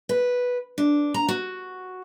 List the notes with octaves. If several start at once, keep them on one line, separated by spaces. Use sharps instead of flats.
B4
D4
A#5
F#4